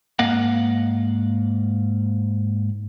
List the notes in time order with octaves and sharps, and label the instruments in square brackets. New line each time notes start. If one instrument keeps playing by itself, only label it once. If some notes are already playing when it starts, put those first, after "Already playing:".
[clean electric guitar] G#2 A#3 D#5 F5 F#5